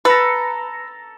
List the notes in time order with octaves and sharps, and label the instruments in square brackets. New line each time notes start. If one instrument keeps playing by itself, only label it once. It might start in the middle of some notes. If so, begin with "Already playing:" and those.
[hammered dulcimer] A4 A#5 [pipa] B4